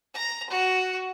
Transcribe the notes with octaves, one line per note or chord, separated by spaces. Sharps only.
A#5
F#4